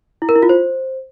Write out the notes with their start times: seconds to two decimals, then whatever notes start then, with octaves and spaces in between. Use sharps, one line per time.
0.22 E4
0.29 A#4
0.36 E4
0.42 F4
0.49 C5